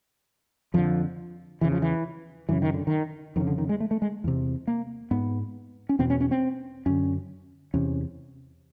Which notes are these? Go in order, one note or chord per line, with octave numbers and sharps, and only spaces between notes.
F2 D3 F3
E2 C#3 E3
F3
E3
F#2 C#3 E3
D#3
D3
D#3
F2 C#3 D#3
D3
D#3
G#3
A3
A3
G#3
E2 C3
A#3
G#2 B3
C#4
E2 B2 C4
C#4
C#4
C4
F#2 D3 C#4
E2 C3 C#4